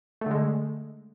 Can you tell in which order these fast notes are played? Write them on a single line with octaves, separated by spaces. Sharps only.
A3 D3 G#3